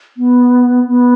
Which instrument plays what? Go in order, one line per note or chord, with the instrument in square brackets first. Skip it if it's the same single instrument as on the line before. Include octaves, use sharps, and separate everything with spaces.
[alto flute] B3
B3